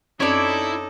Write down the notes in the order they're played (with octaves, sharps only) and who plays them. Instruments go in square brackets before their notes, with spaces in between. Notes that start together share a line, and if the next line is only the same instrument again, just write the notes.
[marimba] F#2 C4 C#4 [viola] D#4 A4 [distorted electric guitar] E4 [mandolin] C#5 D5